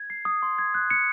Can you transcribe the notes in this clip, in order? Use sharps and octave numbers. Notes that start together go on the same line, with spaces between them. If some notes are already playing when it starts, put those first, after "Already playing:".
Already playing: G#6
C7
D#6
C6
G#6
F#6
C#7